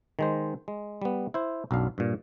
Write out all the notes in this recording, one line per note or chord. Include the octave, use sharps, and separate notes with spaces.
D#3 G#3 C5
G#3
G3 B3
E4 C5
B1 F#2 D4 F5
G2 A#2